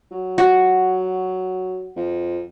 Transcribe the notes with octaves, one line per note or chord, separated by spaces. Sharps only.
F#3
F#4
F2